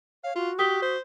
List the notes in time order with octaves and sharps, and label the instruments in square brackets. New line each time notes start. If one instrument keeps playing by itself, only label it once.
[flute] C#5 [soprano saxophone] F5
[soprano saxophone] F4 [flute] F#4
[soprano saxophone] G4 [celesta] D#6 B6 G7
[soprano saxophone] C5